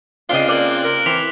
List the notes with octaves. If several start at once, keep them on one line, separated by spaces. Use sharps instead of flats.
C#3 C4 D4 F4 D#5 F5 G7
A#3 D5 F#6 F#7
A#4
E3 C4 C6 D6 B6 F7